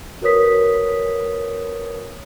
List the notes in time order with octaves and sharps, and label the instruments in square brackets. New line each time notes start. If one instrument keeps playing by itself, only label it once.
[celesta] F#4 A#4 B4 C#5 D#6 B6